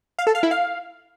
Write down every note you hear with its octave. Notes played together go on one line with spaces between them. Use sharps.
F5
A4
F5
E4
F5